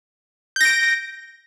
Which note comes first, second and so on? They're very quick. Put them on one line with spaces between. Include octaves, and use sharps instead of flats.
G6 A#6 D7